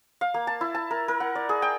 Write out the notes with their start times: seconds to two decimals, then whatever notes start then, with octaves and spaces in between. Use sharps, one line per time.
0.21 F5
0.34 A#3
0.47 A5
0.61 E4
0.75 A5
0.91 A#4
1.08 A#4
1.20 F#5
1.35 D5
1.49 G#4
1.62 G5